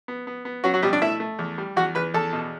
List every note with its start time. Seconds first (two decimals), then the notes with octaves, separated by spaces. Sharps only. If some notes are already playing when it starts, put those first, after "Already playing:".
0.08 B3
0.27 B3
0.45 B3
0.64 F#3 C#4 F#4
0.74 F#3 F#4
0.82 B2 G3 G4
0.93 D4 D5
1.02 A3 E4 E5
1.20 A3
1.39 E2
1.58 G3
1.76 E2 F#4 F#5
1.95 E2 B4 B5
2.14 E2 A4 A5
2.33 B2